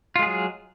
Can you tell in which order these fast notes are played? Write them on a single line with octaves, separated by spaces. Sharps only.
F4 G#3 G#4 F#3